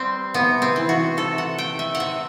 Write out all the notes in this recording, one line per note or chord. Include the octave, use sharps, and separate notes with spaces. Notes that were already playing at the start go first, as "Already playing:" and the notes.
Already playing: G3 C4
C3 B3
C4
E3
F#4
C3 A4
F#5
A3 G5
E5
F#5
C3 E5